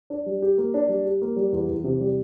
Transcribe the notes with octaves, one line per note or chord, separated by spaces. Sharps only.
D4
G3
G4
A#3
D4
G3
G4
A#3
G3
E2
E2
C3
G3